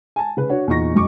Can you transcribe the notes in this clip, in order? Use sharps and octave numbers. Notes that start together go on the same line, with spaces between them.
G#5 A5
C#3 B4
D4 F#4 C#5
E2 A#2 D#4 C#6 A#6
F#1 B1 C#6 D6